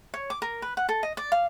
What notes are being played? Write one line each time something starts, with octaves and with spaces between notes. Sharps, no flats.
C#5
D6
A#4
B4
F#5
A4
D#5
D5
F5